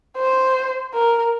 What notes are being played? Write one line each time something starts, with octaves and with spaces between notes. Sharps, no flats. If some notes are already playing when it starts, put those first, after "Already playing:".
C5
A#4